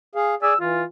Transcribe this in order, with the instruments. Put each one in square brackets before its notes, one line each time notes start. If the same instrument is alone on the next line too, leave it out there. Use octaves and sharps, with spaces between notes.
[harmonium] G#4 F5
[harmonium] G#4 D5 G#5 [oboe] E6
[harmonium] E3 [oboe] F4